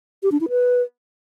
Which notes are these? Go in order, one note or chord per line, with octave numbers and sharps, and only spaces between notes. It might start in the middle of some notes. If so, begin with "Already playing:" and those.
G4
D4
E4
B4